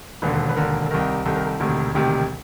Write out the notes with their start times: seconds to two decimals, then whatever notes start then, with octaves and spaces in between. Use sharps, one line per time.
0.22 E1 D#2 D3 B4
0.49 B4
0.56 E1 D#2 D3 A#4
0.86 A4
0.91 C2 C3 D#3 A#4
1.25 C2 C3 D#3 A4
1.36 A#4
1.45 A4
1.60 E1 D2 C3 D#3
1.94 E1 D2 C3 D#3 G4